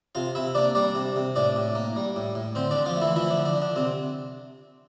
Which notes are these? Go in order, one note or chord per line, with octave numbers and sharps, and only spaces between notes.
C3 F4 F5
C3 E4 E5
A#3 D4 D5
G3 D4 D5
C3
C3
A2 D4 D5
A2
A#3
G3
A2
A2
D3 C4 C5
D4 D5
D3
F3 F4
A3
E3 E4
E3 F3 E4
D4
D3
D4
D3
D4
C3 C4